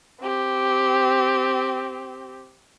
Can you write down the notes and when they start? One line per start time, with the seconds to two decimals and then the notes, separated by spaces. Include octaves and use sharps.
0.21 C4 G4